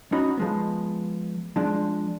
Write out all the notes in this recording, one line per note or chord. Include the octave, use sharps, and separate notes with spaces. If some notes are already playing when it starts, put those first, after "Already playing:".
C#4 D#4 F#4 C#5 B5
F3 G#3 B3
F3 G#3 D4